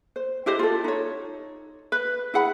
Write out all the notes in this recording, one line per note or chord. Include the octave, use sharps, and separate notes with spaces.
C5
E4 G4 C5 D#5
F4 A4
D#4 C#5
B4
E4 G#4 F#5 B5